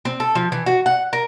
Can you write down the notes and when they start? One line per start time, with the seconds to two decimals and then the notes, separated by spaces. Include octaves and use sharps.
0.05 C4
0.20 A4
0.35 F3
0.52 E3
0.66 F#4
0.86 F#5
1.13 A#4